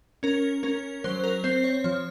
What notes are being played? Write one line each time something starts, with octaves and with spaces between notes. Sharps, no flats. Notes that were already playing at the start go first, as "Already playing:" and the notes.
C#4 A#4
C#4 A#4
F#3 C5
A#4
C4 C5
C#5
F3 C#5